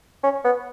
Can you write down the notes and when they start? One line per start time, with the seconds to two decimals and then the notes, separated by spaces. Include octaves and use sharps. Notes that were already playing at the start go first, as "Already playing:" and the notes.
0.23 C#4
0.45 B3